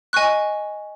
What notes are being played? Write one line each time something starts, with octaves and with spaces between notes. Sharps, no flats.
D#5 G#5 C#6 F#6